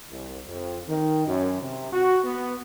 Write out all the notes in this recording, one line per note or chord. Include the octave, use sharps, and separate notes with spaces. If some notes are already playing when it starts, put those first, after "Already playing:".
C2
F2
D#3
F#2
C3
F#4
B3